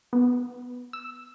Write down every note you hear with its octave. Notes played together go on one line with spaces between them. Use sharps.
B3
E6